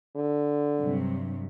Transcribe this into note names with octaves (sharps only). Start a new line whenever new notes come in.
D3
G2 C3 F#3